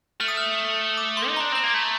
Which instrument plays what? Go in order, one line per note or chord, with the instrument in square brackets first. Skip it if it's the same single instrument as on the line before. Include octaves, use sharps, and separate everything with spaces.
[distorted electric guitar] A3 [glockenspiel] F6
[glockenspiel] D#6
F6
D6
C6
[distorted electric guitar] D#4
[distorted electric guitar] D4 [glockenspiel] A#5
[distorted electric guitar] C4 [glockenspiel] A#5
[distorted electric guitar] A#3
A3